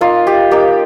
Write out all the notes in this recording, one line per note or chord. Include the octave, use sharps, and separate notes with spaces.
A#3 D#4 F4
G4
A#3 D#4 G4